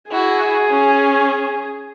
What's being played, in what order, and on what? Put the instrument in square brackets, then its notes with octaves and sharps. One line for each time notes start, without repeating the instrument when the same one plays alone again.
[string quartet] E4 F#4 [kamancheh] G#4
[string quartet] C#4